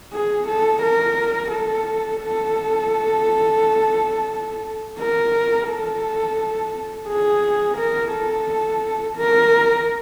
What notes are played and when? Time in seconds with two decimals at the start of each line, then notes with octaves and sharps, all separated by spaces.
0.13 G#4
0.48 A4
0.83 A#4
1.51 A4
2.22 A4
5.00 A#4
5.69 A4
7.09 G#4
7.78 A#4
8.13 A4
9.17 A#4